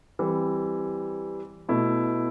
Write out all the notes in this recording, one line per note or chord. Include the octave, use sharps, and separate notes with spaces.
E3 G3 C4
B2 A3 E4